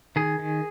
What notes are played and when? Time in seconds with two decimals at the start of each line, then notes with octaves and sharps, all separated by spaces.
0.16 D#3 G#4
0.39 D#3